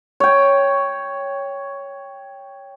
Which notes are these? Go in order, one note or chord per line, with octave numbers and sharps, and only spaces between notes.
C#5 G5